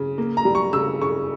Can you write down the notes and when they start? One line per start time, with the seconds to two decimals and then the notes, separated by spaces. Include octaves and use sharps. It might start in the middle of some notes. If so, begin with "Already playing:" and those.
Already playing: C#3
0.18 A#3
0.37 A#5
0.45 G3
0.55 C#6
0.73 C#3 E6
1.01 C#3 C#6